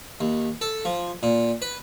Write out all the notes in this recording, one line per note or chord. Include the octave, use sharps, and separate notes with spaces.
D#2
A4
F3
A#2
B4